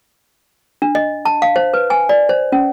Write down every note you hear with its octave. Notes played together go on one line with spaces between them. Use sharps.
D4
D#5
A5
F5
C5
B4
G#5
D5
C5
C#4